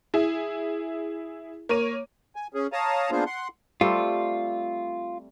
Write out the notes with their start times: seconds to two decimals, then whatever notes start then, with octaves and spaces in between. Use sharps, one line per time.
0.14 E4 G#4
1.69 A#3 C#5 D#7
2.36 G#5
2.54 C#4 G#4
2.73 C#5 F5 A5 A#5 D#6
3.11 A#3 B3 D4 F4 G#4 C5
3.26 F#5 C6
3.81 G3 A3 C4 F4